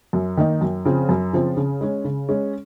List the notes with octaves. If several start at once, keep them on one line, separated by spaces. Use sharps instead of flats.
F#2
D#3 A#3 D#4
F#2
C#3 F3 C4
F#2
C#3 F3 C4
C#3
G#3 C#4
C#3
G#3 C#4